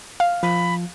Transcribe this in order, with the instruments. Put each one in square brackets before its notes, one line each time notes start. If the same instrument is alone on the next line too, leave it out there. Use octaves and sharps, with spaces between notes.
[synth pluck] F5
[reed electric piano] F3 [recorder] B5